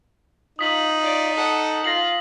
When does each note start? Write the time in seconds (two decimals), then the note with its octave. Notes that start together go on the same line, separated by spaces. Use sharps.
0.59 D#4 F4 D#6 B6 F#7
1.00 F4 D5
1.34 A4 F#5
1.84 F4 A#6 C7 F#7